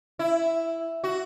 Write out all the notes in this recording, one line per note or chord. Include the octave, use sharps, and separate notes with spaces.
E4
F#4